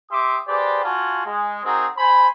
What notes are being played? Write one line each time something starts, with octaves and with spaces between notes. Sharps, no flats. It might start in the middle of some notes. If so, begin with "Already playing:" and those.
G4 E5 C6 D6 D#6
G4 G#4 B4 C5 D5
F4 F#4 G#5 A5
G#3
C4 D#4 F#4 G#4 A#4
C5 G#5 B5